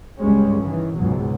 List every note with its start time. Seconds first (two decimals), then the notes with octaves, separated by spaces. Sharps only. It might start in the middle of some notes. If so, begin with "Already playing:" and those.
0.20 C#2 G2 G3 G#3 C#4
0.63 D#3 E3
0.97 C#2 G#2 B2 F#3 G#3